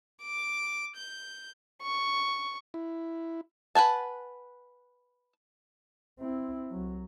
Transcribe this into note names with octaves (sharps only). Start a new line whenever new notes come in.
D6
G6
C#6
E4
B4 F#5 G#5 A5
C4 E4
C2 F#3